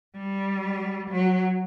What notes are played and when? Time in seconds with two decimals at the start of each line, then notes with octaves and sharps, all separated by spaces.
0.16 G3
1.11 F#3